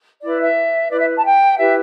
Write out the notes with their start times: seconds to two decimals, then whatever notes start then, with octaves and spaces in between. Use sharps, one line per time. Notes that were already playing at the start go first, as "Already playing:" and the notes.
0.23 E4 B4 D5
0.41 E5
0.91 E4 B4 D5
0.99 E5
1.17 A5
1.25 G5
1.58 E4 G4 B4 E5